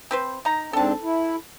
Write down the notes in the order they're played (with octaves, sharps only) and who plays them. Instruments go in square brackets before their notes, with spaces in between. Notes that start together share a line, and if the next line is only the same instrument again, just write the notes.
[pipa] C4 B4 C5
D#4 A#5
[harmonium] G#2 C4 D4 [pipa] A4 A5
[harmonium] E4